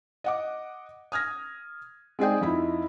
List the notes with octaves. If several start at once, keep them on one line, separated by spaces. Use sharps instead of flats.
D#5 F#5 D6
D#6 F6 G#6 A#6
G#3 C4 D#4 G#4 D5 G5
F2 D#4 E4 B5